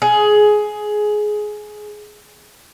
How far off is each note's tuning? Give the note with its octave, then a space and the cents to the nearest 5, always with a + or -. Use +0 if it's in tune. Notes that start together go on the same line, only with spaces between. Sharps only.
G#4 +15